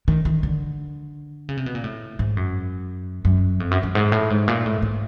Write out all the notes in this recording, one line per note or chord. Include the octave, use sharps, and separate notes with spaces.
D#3
D#3
D3
C#3
C3
B2
A#2
A2
G#2
F#2
F#2
F2
F#2
F#2
G#2
A2
G#2
A#2
A2
G#2